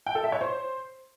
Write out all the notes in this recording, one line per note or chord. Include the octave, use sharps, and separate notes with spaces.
G5
A4
E5
C#5
C5